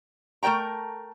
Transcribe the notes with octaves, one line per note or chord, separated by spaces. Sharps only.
A3 A#4 C#5 G5 A#5